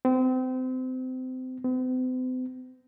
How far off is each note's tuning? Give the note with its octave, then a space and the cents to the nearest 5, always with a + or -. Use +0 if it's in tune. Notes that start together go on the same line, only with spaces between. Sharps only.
C4 -30
C4 -45